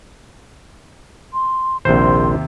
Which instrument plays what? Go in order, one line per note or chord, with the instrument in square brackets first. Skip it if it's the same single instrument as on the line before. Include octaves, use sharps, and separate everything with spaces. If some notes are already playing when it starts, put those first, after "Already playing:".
[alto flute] C6
[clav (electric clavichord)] A#1 C5 [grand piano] D#2 C3 [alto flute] C6